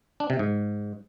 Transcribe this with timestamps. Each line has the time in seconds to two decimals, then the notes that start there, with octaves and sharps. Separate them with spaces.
0.20 D4
0.30 C3
0.39 G#2